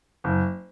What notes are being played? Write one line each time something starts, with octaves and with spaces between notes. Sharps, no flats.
F#1